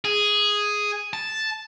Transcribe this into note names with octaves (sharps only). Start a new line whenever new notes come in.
G#4
A5